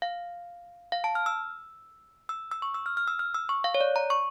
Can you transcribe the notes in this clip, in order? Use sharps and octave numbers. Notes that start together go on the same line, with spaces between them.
F5
F5
A5
F6
E6
E6
E6
C#6
E6
F6
F6
E6
F6
E6
C#6
F5
C#5
D5
A#5
C#6